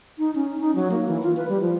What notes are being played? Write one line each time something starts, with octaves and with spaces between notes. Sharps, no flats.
D#4
C#4
D#4
F#3
A#3
E3
F4
B4
G3
F3